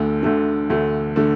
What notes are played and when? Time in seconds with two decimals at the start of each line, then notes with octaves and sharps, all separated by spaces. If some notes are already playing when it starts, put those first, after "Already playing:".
Already playing: D2 D3 A3
0.23 D2 D3 A3
0.70 D2 D3 A3
1.16 D3 A3